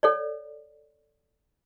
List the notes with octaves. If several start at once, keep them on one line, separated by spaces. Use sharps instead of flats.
A4 C#5 D5